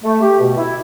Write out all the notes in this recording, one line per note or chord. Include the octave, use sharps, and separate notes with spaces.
A3
G4
B2
E4